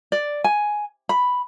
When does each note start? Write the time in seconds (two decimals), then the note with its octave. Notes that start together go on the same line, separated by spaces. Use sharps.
0.12 D5
0.44 G#5
1.09 B5